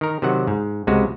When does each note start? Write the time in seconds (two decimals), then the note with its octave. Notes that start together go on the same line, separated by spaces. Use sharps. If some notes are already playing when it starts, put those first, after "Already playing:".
0.01 D#3 A#4
0.22 C3 D#3 F#3 F#5
0.47 G#2
0.87 C#2 C3 G#3 F#4